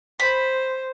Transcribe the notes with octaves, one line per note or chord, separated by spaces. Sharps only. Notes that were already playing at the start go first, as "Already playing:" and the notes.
C5 B5